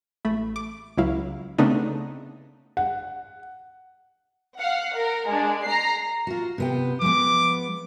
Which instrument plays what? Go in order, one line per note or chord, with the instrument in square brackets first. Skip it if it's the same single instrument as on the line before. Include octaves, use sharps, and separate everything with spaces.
[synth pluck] A1 A3 B5
D6
C#2 F#3 E4 F5
C#3 A3 B3 C4 D4 D#4
[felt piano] F#5
[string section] F5 F#5
A#4
G#3 D4
A#5 C7
[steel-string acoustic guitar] F4 F#4
C3 B3 G5
[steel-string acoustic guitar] F3 G#3 B3 [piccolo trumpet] D6